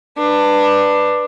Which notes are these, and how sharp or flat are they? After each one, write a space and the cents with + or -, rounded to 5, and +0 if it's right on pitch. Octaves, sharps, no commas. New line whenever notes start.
D4 +15 B4 +0